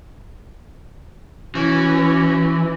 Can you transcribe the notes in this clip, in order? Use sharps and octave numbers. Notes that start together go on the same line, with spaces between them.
E3 C#4 F#4